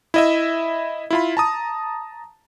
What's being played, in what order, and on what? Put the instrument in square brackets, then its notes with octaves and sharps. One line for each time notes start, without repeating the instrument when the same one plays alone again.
[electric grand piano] E4 D#5 E5
E4 F4 B5
A5 A#5 D#6